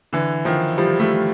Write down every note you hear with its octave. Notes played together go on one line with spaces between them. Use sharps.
D3 E3
D#3 F3
F3 G3
G3 A3